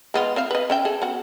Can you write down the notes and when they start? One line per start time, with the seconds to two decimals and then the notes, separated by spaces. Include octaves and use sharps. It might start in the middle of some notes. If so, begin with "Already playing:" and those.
0.14 G#3 B3 F4
0.36 C4 E5 F5
0.51 B4 D#5
0.70 C#4 E5 G5
0.85 G#4 A4
1.02 B3 F#4